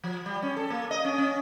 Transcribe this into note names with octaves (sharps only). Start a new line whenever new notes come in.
F3
G3
C#4
A4
A#3
D#5
C#4
C#4